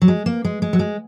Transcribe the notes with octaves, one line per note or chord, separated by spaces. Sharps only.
F#3
G#3
A#3
G#3
G#3
F#3
G#3